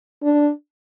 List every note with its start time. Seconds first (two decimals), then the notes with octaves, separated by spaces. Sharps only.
0.23 D4